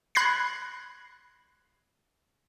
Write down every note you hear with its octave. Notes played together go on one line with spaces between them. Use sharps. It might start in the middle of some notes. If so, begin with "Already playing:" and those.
B5 F#6 G#6 A#6 C7